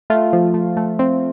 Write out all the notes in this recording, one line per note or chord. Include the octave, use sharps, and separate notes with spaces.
A3 F4
F3
A3
A3
C4